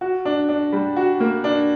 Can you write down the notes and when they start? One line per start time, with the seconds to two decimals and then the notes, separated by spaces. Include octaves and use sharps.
0.01 F#4
0.25 D4
0.49 D4
0.72 G3
0.96 F#4
1.20 A#3
1.44 D4